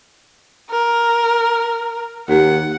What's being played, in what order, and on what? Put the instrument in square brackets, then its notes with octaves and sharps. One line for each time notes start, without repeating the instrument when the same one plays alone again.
[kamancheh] A#4
[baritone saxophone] D#2 [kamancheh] F#5